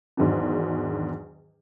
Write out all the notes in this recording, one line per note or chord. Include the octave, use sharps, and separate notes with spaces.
E2 G#2 D#3 F#3 D4